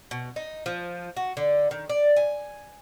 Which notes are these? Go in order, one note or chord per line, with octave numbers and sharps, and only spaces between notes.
B2
D#4
F3
F#4
D3
D#3
D5
G#5